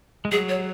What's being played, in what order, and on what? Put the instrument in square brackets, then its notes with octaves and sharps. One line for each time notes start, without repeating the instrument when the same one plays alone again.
[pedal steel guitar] G#3
[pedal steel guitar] F#3 [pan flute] G#4
[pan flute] C#5